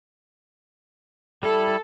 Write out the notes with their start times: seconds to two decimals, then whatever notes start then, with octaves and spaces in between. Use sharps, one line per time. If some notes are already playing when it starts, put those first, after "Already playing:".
1.43 G3 E4 A4